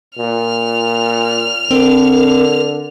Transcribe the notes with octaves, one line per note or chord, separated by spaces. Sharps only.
A#2 F6
D3 C4 A#4